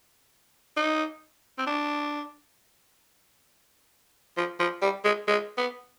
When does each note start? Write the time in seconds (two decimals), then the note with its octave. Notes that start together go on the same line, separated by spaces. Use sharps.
0.77 D#4
1.58 C4
1.67 D4
4.37 F3
4.60 F3
4.82 G3
5.05 G#3
5.28 G#3
5.58 B3